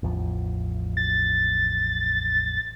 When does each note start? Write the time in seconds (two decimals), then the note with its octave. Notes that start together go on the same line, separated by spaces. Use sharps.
0.03 A1 E2 F3
0.97 A6